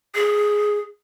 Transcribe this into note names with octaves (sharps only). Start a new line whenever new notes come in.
G#4